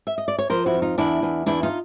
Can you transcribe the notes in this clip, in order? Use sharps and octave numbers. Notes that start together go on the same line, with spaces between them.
E5
D#5
D5
C#5
F3 A#4 C5
E4 F#4
F2
D#4 F4
E2 D4 E4
E2
E2 D4 E4
D#4 F4